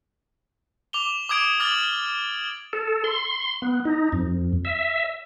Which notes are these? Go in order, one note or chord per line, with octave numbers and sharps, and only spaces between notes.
D6 F7 G7
D6 D#6 G#6 D7
D6 F6 A6 F#7
A4
C6
B3
D#4
F2
E5